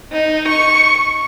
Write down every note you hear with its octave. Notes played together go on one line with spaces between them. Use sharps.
D#4
C#6